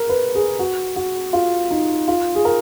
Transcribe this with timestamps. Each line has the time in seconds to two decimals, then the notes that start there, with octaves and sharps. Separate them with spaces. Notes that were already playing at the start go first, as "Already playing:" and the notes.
Already playing: A#4
0.09 B4
0.35 G#4
0.59 F#4
0.96 F#4
1.33 F4
1.71 D#4
2.08 F4
2.35 G#4
2.45 A#4